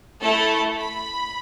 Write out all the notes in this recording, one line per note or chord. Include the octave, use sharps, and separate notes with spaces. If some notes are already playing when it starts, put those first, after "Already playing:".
A3 E4 A4 A5
B5